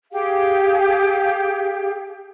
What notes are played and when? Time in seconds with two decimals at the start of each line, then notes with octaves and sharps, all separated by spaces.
0.11 G4 G#4 F5